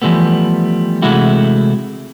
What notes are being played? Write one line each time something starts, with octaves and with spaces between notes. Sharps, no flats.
E3 F3 G3 A3 B3
C3 E3 G#3 A3 E4 F#4